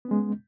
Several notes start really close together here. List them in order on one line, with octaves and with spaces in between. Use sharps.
B3 C#4 G#3